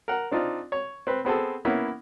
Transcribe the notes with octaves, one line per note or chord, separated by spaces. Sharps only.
A#4 F#5
C4 D4 D#4 F4
C#5
C4 B4
B3 C4 G#4 A4
A#3 B3 C#4 E4